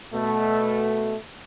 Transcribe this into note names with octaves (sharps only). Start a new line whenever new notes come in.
B2 A3